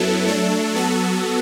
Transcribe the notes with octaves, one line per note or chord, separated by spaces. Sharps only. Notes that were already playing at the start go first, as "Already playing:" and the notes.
Already playing: F#2 F#3 B3 E4 A4
F#3 A3 D4 A4
F#3 B3 F#4 A4